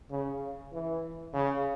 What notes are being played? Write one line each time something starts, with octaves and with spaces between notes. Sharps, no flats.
C#3
E3
C#3